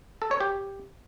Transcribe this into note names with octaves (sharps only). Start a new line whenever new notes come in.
A4
C#5
G4